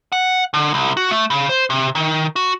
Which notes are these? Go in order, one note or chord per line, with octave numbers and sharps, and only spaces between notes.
F#5
D3
C2
F#4
A3
C#3
C5
C3
D#3
F#4